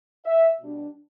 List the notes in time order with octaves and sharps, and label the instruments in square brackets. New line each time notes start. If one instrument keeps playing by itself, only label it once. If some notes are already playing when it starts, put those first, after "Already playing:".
[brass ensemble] E5
B2 G3 D4